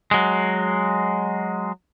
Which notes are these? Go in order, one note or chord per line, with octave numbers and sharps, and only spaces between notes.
F#3 G#3